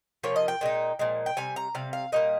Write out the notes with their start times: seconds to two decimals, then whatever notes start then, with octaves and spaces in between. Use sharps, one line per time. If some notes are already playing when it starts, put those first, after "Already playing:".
0.24 C3 F3 A#3 C#5
0.36 D#5
0.48 G5
0.61 A#2 G#3 D#4
0.99 A#2 F3 G#3
1.26 G5
1.37 C3 G3 G#5
1.56 A#5
1.75 C3 G3 F5
1.93 F5
2.12 A#2 G3 A#3 D#5